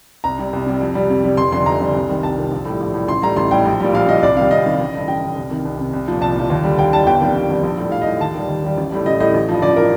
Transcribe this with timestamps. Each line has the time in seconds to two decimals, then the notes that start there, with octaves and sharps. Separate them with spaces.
0.24 C2 A#5
0.39 C3 G3
0.53 C2
0.66 C3 G3
0.81 F2
0.95 C3 G3
1.10 F2
1.24 C3 G3
1.37 F1 C6
1.52 F2 D3 G3 C6
1.66 F1 A#5
1.81 F2 D3 G3
1.94 C2
2.09 C3 D#3 G3
2.23 C2 A5
2.38 C3 D#3 G3
2.52 A#1
2.65 A2 G3
2.81 A#1
2.94 A2 G3
3.08 A1 C6
3.22 A2 G3 A#5
3.36 A1 C6
3.51 A2 G3 G5
3.65 A#1
3.80 A#2 G3
3.93 A#1 F5
4.08 A#2 G3 D#5
4.22 C2 D5
4.36 C3 D#3 G3 F5
4.51 C2 D#5
4.66 C3 D#3 G3
4.80 A1
4.94 G2 D3
5.08 A1 G5
5.21 G2 D3
5.36 C2
5.51 C3 D#3
5.65 C2
5.78 C3 D#3
5.93 C2
6.08 A#2 F3
6.21 C2 A5
6.36 A#2 F3
6.50 D#2
6.64 D3 G3
6.78 D#2 G5
6.93 D3 G3 A5
7.06 G1 G5
7.21 F2 D#3 G3
7.36 G1
7.49 F2 D#3 G3
7.63 A#1
7.78 A2 G3
7.92 A#1 F5
8.02 D#5
8.06 A2 G3
8.20 D#2 A5
8.34 D#3 G3
8.48 D#2
8.63 D#3 G3
8.78 A1
8.92 A2 G3
9.06 A1 D#5
9.20 A2 G3 D#5
9.34 A1
9.49 G2 F3
9.62 A1 D5
9.77 F3 A#4